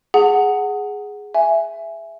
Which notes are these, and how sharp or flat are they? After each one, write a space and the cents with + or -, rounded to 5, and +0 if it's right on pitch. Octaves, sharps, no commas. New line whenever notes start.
G#4 +0 F#5 +0 A5 +40
E5 +10 G#5 +0